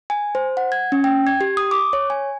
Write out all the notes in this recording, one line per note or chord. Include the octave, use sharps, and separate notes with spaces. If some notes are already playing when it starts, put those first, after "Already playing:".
G#5
C5
F#5
G#6
C#4
G5
G#6
G4
D#6
D6
C#5
G#5